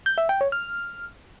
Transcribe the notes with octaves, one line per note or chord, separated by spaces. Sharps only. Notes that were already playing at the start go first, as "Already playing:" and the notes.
G6
E5
G5
C#5
F6